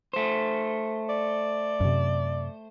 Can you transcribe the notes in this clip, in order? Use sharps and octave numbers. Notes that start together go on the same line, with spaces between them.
A3 C5
D5
F#2 C3